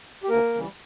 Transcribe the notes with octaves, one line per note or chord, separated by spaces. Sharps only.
G4
D2 A#3 A#4
C#3 E3 G3